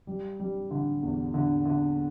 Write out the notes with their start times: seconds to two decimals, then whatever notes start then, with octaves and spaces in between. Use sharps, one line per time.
0.07 G3
0.40 G3
0.71 D3
1.03 E2
1.34 D3
1.65 D3